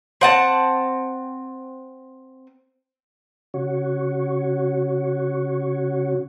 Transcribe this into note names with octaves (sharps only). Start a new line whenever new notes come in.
C4 F#5 A5
C#3 F#4 C#5